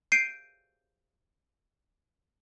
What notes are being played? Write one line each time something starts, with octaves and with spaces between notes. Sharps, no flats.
G6 C7 D7 D#7